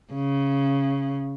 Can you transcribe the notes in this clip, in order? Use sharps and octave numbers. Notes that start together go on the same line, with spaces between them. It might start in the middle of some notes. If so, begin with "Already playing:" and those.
C#3